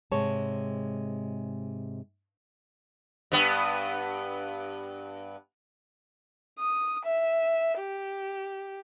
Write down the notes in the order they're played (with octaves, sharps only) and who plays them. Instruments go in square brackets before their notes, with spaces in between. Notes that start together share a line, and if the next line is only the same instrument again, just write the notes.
[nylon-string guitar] G#2 C3 G#3 C#5 A5
[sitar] G2 B3
[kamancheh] D#6
E5
G4